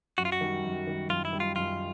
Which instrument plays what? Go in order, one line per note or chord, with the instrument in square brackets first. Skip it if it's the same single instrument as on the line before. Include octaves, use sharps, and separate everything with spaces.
[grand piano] F#2 [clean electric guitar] F#4
[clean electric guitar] F4
F#4
[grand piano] D#3 G3
F#2
D#3 G3
[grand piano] F#2 [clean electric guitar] F4
[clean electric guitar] E4
[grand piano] D#3 G3
[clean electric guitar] F4
[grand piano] F#2 [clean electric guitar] F4